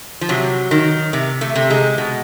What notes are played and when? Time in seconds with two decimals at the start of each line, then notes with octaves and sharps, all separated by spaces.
0.21 F3
0.29 C3 F#3
0.71 D#3
1.13 C3
1.41 A3
1.55 C3
1.70 G#3
1.98 B2